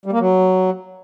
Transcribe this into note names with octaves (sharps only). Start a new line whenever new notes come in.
G3
A#3
F#3